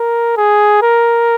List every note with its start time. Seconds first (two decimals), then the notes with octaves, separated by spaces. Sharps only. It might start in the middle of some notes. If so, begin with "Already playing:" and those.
Already playing: A#4
0.37 G#4
0.82 A#4